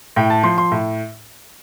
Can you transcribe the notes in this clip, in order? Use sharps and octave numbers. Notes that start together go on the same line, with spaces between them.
A2 G5
A5
F3 C6
C6
A2